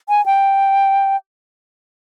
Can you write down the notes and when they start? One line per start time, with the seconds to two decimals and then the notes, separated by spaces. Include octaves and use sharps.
0.09 G#5
0.26 G5